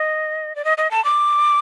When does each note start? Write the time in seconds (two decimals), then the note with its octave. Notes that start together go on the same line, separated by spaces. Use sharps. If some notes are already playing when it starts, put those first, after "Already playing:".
Already playing: D#5
0.56 D5
0.65 D#5
0.78 D#5
0.91 A5
1.05 D6